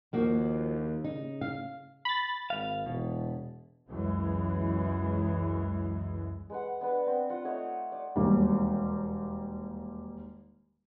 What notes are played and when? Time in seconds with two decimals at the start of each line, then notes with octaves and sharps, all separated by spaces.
0.13 D#2 F3 A#3 F#4
1.04 C#3 D#4
1.41 F5
2.05 B5 A6
2.50 G#1 F5
2.86 E1 B2
3.90 C#2 F#2 E3 G#3
6.50 G#3 B4 F#5
6.81 B3 D4 B4
7.06 C4
7.30 F4 F#5
7.44 A3 D#4 C#5 D#5
7.92 D5
8.16 E1 D#2 G3